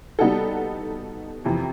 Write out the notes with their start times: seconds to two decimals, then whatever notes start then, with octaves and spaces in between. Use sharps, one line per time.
0.19 G3 B3 D#4 F#4 A4
1.44 F2 C3 E3